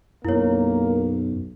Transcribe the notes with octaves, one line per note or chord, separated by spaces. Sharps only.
B1 F#2 A#3 E4 C#5